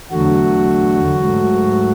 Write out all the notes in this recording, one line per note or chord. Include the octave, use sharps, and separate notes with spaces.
E2 D3 F#3 A3 F#4
G#2 F#3 A3